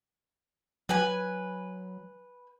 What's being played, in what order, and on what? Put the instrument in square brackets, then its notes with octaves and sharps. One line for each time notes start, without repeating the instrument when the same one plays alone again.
[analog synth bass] F#3 [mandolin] B4 G#5